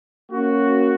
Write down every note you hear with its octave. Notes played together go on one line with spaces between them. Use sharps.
A#3 C#4 F#4